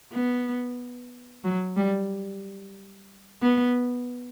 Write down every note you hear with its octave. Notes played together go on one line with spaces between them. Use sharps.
B3
F#3
G3
B3